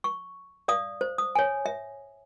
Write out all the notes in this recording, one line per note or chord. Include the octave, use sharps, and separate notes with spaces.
C#6
D5 F5 D#6
C5
D#6
C#5 G#5
E5